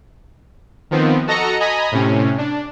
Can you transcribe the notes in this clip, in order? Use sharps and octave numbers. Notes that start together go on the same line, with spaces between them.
D#3 F3 B3 C4
F#4 A4 D#5 A#5 A#6 C#7
D#5 G#5 A#5 B5 D#6
A2 C3 C#4
D4